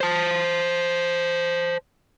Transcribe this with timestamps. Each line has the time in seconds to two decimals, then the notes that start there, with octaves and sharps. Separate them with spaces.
0.01 C5 A5